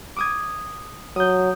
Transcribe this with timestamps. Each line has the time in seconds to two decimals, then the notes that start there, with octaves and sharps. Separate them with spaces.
0.16 D6 D#6 G#6
1.16 F#3 D#6 G6